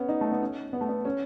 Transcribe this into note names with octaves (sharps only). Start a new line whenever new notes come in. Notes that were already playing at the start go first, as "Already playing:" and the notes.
Already playing: B3 C#4
D#4
A3
B3
C#4
B3
A3
B3
C#4